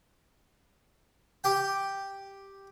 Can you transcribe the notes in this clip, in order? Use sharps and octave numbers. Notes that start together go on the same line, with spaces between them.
G4 G5